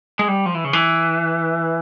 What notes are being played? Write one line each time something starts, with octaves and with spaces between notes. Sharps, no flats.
G#3
G3
F3
E3
C#3
E3